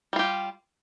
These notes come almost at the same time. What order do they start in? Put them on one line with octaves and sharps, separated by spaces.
G3 F4 G4